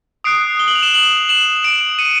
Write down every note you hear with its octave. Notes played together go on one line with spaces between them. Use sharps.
D#6 F#6 C7 D7
G7
F#7
F7
E7 F#7
E7 F#7
E7 F#7
D7 E7
C#7 D#7